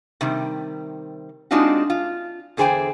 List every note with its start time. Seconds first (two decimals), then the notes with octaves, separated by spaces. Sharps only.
0.21 C3 D#3 G3
1.51 G#3 C4 D4 D#4 F4 F#4
1.90 F4
2.57 E2 D3 G#4 C5 G5 G#5